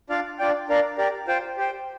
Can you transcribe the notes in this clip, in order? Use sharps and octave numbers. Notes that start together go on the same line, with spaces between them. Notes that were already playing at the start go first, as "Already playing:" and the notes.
D4 F4 D5 F5
D4 F4 D5 G5
D4 A#4 D5 F5
G4 A#4 D5
F4 C5 G5
G4 C5 G5